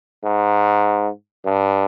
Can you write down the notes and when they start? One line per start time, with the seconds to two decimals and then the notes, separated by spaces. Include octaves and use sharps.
0.24 G#2
1.45 G2